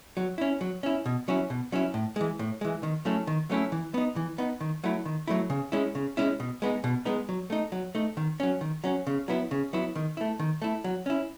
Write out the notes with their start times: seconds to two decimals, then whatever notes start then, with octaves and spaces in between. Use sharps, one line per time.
0.17 F#3
0.38 C#4 E4
0.61 F#3
0.83 C#4 E4
1.06 B2
1.28 F#3 C#4 E4
1.50 B2
1.72 F#3 C#4 E4
1.94 A2
2.16 E3 G#3
2.39 A2
2.61 E3 G#3
2.83 D#3
3.05 F#3 A3 C#4 E4
3.27 D#3
3.50 F#3 A3 C#4 E4
3.72 E3
3.94 B3 D#4
4.16 E3
4.38 B3 D#4
4.61 D#3
4.84 F#3 A3 E4
5.05 D#3
5.28 F#3 A3 E4
5.50 C#3
5.72 G#3 C#4 E4
5.95 C#3
6.17 G#3 C#4 E4
6.40 B2
6.62 G#3 B3 D#4
6.84 B2
7.05 G#3 B3 D#4
7.29 F#3
7.50 A3 D#4
7.72 F#3
7.95 A3 D#4
8.17 D#3
8.40 F#3 C#4
8.61 D#3
8.84 F#3 C#4
9.07 C#3
9.28 F#3 B3 E4
9.51 C#3
9.73 F#3 B3 E4
9.96 D#3
10.17 A3 E4
10.40 D#3
10.62 A3 E4
10.84 F#3
11.06 C#4 E4